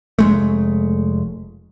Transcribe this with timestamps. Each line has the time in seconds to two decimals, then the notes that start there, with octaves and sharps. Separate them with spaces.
0.19 F1 G#3 A3